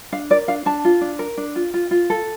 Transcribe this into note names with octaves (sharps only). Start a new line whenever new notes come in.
D4 F5
A#4 D5
D4 F5
D4 A5
F4
D4
A#4
D4
F4
F4
F4
A4